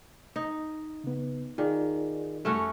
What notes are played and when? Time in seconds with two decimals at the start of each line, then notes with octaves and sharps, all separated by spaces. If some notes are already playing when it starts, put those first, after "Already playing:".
0.36 D#4
1.04 C#3 B3
1.58 D#3 F4 G#4 D5
2.45 F2 G3 A3 C#4 F#4